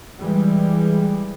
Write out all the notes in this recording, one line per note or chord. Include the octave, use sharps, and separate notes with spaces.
E3 G3 G#3